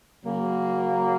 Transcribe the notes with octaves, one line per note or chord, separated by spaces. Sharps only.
C#3 F#3 A#3